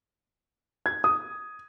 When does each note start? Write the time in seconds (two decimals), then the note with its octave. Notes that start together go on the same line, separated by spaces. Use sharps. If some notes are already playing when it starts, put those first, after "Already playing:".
0.86 G#6
1.04 D#6